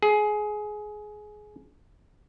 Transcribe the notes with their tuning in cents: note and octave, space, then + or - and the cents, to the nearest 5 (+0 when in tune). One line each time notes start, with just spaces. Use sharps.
G#4 +20